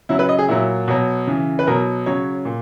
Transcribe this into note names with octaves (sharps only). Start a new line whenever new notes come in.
C#3 F#3 E4
B4
D#5
G#4
A#2 F#3 E4
B2 F#3
C#3 E3
B4
B2 F#3 A#4
C#3 F#3 C#5
A#2